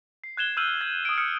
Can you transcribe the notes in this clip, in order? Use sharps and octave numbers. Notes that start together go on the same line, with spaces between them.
C7
F#6 G#6 E7 G7
E6 F6 G6 D#7 F#7
G#6
D#6 D7
D#6 F6 G#6 C#7